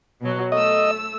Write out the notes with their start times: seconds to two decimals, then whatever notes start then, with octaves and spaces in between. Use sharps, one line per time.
0.22 B2 F#3
0.52 A3 D#5 E6